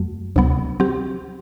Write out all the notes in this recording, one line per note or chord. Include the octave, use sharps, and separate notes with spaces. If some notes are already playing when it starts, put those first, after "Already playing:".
Already playing: F#2 F#3 A3
D2 C3 F#3 B3
F#3 C4 G4